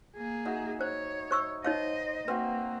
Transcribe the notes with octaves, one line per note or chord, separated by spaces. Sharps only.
A#3 G#4
D#4 F#4 E5
C5 C#5
C5 C#6 E6
D#4 C5 C#5 D#5 F5
A#3 C4 F#4 B4 E5